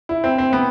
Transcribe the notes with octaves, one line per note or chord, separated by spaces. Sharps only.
E4
C4
C4
B3